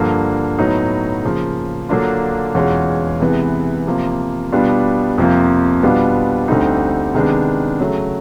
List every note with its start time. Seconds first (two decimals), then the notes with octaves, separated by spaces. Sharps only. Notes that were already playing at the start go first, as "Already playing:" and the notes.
Already playing: G2 D3 F3 A#3
0.59 A2 F#3 B3 D#4
1.24 C#3 F3 A#3
1.89 D3 F#3 A#3 D4 F4
2.55 E2 B2 G#3 C#4 F4
3.20 C3 E3 G#3 B3
3.87 C3 F3 A#3
4.52 B2 G3 B3 D4 F4
5.18 F2 C3 F3 A#3
5.83 B2 G3 B3 D4 F4
6.48 D2 D3 G3 C4 D#4
7.15 C3 D#3 G#3 B3 D4
7.79 C#3 F#3 A3